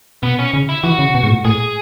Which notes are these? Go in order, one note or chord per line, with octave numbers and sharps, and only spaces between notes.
B2 B3
C#4
C#3
E4
E3 F#4
C#3
B2
G#2
A2
A2 G#4